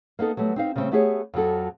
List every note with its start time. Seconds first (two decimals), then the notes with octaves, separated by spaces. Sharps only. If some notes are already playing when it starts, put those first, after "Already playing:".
0.19 A#3 B3 D#4 A4
0.37 F#3 G3 A3 B3
0.56 C4 D#4 F5
0.76 C#3 G3 A3 C4
0.92 A3 B3 G4 G#4 C5 C#5
1.34 F2 F3 F#3 A4